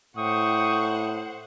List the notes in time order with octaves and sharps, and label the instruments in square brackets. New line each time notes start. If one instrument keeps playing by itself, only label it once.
[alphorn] A2 [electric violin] C5 F#5 [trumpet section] G5 C#6 D#6